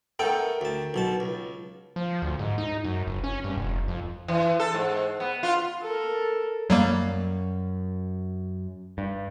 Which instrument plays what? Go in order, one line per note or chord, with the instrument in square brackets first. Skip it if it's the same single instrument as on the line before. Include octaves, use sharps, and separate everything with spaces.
[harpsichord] A3 B3 A4 [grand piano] A#4 G5
[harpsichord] D2 A5
B1 B2 A5
C#2
[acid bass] F3
D2
G#2
D#4
F#2
F#1
C#4
G2
F1
F2
[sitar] E3
A4
G#2
B3
F4
[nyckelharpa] A4 A#4
[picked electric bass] F#2 [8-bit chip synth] F#3 G3 A#3
[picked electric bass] G2